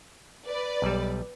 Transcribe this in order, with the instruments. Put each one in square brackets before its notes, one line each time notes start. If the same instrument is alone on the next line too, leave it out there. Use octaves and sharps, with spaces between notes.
[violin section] B4 D5
[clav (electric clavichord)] B1 G3